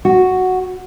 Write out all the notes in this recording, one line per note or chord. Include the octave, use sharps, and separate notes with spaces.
F#4